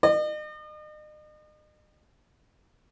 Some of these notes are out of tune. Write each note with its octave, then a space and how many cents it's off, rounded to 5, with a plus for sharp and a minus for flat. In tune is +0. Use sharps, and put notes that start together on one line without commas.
D#5 -40